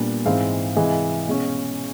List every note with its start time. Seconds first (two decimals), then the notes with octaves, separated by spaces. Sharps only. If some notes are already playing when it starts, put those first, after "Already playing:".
Already playing: A#2 G3 B3 D4
0.26 G#2 E3 G#3 C4 F5
0.76 C3 E3 G#3
1.28 B2 G#3 C#4